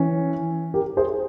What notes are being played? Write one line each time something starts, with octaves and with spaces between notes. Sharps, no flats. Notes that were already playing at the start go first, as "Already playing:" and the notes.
Already playing: E3 C#4
G4 A#4
G#4 C5